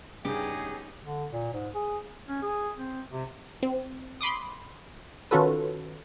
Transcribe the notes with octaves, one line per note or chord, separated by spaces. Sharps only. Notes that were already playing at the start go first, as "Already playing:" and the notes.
G2 C#3 B3 C#4 D#4 G4 G#4
D3
A#2
G#2
G#4
C#4
G#4
C4
C3
C4
B5 C6 D6 D#6
D#3 C#4 F4 F#4 A4 B4